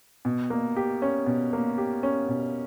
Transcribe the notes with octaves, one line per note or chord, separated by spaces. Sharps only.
B2
A#3
G4
C#4
B2
A#3
G4
C#4
B2